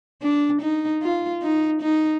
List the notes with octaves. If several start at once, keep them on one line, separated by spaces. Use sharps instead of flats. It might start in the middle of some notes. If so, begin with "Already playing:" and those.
D4
D#4
F4
D#4
D#4